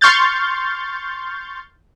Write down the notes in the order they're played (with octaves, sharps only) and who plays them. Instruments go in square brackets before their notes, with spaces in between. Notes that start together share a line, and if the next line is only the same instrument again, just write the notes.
[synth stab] C6 C#6 F6 G6 A6